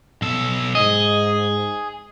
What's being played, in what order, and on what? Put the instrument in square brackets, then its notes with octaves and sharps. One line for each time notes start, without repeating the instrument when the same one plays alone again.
[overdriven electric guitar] B1 A4
[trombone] G#2 [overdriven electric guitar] G#4 [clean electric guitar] D#5